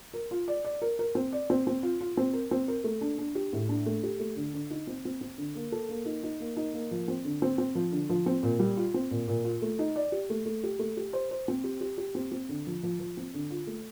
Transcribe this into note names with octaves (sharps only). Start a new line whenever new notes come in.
A#4
F4
D5
D5
A#4
A#4
C4
D5
C4
C4
F4
F4
C4
A#4
C4
A#4
A3
D4
D4
G4
A2
D4
A3
G4
A3
D3
D3
D#4
C4
C4
C4
D3
A#3
A4
A#3
D#4
D#4
A#3
D#4
A#3
F3
C4
D3
C4
C4
F3
D3
F3
C4
A#2
G3
F4
C4
A#2
A#2
F4
A3
D#4
D5
G4
A3
A3
G4
A3
G4
C5
C5
C4
G4
G4
G4
C4
C4
D3
F3
F3
F3
C4
D3
F4
A3